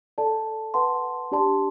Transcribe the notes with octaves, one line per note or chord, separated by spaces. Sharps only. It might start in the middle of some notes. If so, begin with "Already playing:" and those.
A4 D5 A5
B4 F#5 A5 C6
D4 G4 D5 A5 C6